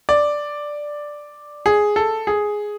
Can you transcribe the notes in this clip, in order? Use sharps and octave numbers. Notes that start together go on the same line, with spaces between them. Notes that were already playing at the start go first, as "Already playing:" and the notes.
D5
G#4
A4
G#4